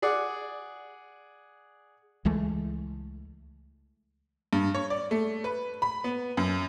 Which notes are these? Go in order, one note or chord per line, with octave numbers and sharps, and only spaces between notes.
G#4 D5 F#5
C#2 E3 G#3 A3
G2
C#5
D5
A3
B4
B5
B3
F#2